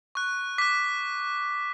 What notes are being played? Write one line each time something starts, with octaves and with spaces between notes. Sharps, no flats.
C#6 F#6
D6 F#6 B6